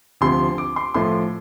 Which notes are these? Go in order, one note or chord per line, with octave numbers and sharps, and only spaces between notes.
D2 C3 F3 C6
D6
C6
A2 F3 A3 C6